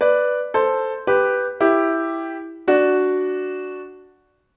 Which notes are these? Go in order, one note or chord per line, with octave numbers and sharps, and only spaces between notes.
B4 D5
A4 C5
G4 B4
E4 G4
D4 F#4